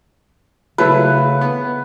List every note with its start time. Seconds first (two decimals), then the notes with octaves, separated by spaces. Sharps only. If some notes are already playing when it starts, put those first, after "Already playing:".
0.78 C#3 F#3 A3 E4 B4
1.41 B3